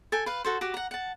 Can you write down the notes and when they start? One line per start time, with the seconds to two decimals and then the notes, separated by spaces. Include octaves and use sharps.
0.12 A4 G5 G#5
0.26 B4 F5
0.44 F#4 A4 C5
0.61 F#4 G4 D6
0.74 F#5 A#5
0.91 F#5 A5